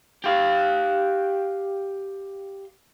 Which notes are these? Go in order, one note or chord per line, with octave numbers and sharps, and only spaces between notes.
G4 F5